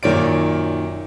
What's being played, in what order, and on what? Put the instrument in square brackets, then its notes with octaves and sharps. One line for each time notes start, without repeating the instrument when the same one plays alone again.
[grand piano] F#2 A#2 D#3 C#5 D5 D7